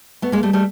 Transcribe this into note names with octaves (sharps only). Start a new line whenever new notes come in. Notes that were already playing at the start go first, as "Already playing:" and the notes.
A3 B3
G#3 A#3
G3 A3
G3 A3